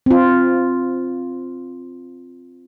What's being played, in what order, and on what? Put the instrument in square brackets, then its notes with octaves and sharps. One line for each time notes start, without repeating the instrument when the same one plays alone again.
[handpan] C4 F4